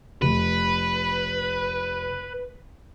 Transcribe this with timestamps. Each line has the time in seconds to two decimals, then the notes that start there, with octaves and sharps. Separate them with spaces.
0.22 F1 B4